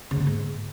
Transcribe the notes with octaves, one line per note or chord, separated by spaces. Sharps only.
C#3
F#2
D#3
G#2